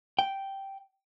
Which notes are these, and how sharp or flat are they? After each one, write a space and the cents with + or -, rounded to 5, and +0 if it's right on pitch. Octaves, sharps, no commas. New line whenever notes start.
G5 -5